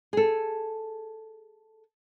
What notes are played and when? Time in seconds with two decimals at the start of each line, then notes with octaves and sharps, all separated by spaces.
0.13 G#4 A4